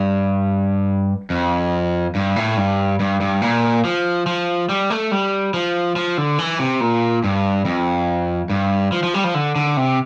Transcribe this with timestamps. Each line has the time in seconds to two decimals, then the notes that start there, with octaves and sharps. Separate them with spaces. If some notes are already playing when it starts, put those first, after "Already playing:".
Already playing: G2
1.30 F2
2.15 G2
2.36 A2
2.57 G2
3.00 G2
3.21 G2
3.42 A#2
3.85 F3
4.27 F3
4.69 G3
4.90 A3
5.12 G3
5.54 F3
5.96 F3
6.18 D3
6.38 E3
6.59 C3
6.80 A#2
7.24 G2
7.65 F2
8.50 G2
8.92 F3
9.03 F3
9.14 G3
9.24 F3
9.34 D3
9.56 D3
9.77 C3